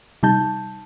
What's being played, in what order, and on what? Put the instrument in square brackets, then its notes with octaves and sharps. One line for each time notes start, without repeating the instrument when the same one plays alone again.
[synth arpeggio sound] C3 G3 D#4 A5 G6